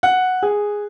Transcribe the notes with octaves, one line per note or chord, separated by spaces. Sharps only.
F#5
G#4